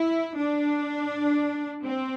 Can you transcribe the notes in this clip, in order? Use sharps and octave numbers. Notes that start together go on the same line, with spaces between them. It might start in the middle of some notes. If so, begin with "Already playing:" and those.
Already playing: E4
D4
C4